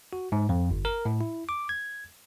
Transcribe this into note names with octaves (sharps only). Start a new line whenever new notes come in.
F#4
G#2
F2
G1
A#4
A2
E4
D6
G#6